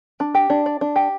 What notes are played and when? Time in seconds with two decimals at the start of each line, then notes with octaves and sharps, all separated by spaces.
0.20 D4
0.35 G4
0.50 D4
0.66 D5
0.81 D4
0.96 G4